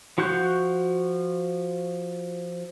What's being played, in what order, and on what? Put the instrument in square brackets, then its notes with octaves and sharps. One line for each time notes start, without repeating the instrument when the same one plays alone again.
[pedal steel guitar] F3 F#4 C#6 F#6 G6